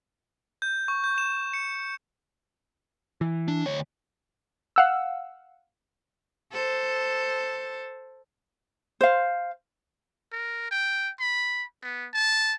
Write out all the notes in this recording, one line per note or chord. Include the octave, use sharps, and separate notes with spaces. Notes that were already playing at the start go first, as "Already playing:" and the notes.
G6
C#6
G6
E7
C#7
E3
D4
D2 C#5
F5 F#5 E6
A4 C5
C5 F5
A#4
G5
B5
B3
A5